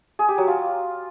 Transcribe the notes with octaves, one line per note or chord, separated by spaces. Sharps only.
G#4
G4
F#3
F4